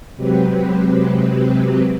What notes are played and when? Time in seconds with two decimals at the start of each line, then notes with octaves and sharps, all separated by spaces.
0.16 C3 F#3 G#3 C4 G4 B4